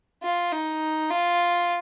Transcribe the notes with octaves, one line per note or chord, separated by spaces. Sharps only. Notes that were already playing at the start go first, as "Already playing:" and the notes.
F4
D#4
F4